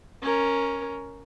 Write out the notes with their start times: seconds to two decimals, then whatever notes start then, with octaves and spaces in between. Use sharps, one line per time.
0.22 C#4 A#4